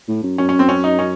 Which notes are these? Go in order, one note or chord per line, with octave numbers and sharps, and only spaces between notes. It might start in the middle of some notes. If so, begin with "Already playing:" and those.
A2
F#2
F#2 C#4
C#4
C4
C#4
D#4
C#4